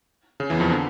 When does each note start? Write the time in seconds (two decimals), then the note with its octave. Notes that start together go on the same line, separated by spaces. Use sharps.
0.40 C#3
0.50 E2 E3
0.60 F2 F3
0.71 D3